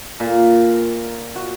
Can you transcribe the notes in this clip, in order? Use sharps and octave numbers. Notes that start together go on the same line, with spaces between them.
A#2
F#4